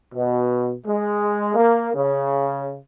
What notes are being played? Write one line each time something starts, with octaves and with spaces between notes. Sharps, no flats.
B2
G#3
A#3
C#3